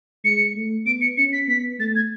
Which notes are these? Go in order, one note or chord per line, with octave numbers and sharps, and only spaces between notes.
G#3 C#7
A3
B3 D7
C#7
C#4 C#7
B6
B3 B6
A3 A6
G#6